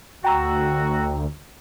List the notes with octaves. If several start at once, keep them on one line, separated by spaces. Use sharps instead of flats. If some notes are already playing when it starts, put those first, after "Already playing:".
D2 F#4 G5 A#5 E6